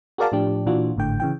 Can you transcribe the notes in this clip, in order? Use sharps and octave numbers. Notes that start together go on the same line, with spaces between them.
F#4 G#4 A#4 D5 F5 A5
A2 F3 D4 G4
A#2 E3 D4 F4 F#4
G#1 A2 D3 G5
C#3 E3 G5